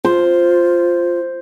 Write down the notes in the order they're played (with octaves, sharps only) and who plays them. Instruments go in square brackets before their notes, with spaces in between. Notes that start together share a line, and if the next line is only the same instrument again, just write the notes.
[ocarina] F4 [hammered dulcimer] C5